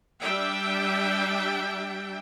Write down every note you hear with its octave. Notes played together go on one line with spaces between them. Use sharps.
G3 D4 E5 G5